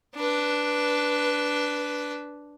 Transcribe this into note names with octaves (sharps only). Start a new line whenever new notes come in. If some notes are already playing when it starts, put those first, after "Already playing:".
D4 B4